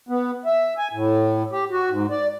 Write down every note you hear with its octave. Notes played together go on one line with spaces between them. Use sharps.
B3
E5
G#5
A2
G4
F#4
G#2
D5